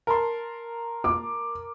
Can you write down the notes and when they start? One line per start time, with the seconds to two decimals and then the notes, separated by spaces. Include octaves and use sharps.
0.07 A#4 A5 C6
1.04 D6